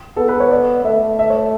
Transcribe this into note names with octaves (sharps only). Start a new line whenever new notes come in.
B3 A4
B4
C#5
D5
A3 E5
E5
C#5